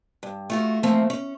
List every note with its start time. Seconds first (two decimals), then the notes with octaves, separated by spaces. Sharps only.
0.23 G2
0.50 A3 F4 F#4
0.83 E3 F3 A3 A#3 C4
1.10 C#4